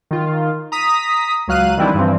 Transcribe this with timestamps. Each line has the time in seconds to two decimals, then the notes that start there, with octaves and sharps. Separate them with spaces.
0.11 D#3 F4
0.72 A#5 D#6 B6
1.48 C#2 F#3 F5 F#6 D#7
1.77 D#3 E3 G3 C4 D4 E4
1.94 G2 E3 F3 C4